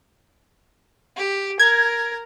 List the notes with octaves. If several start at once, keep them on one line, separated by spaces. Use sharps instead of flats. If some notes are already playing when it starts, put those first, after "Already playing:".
G4
A#4 G#6